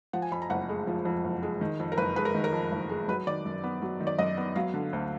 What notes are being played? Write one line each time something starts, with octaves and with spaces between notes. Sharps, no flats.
F3 F#5
G#5
F2 B5
A#5
F#1 F#5
G#3
F3
F2
F#1
G#3
D#3
F2
A#4
F#1 B4
G#3 B4
A#4
D#3
A#4
F2
F#1
G#3
F#3 B4
D#3 D5
F#2
B3
F#3
D#3
D5
F#2 D#5
B3
F#3 F5
D3
D2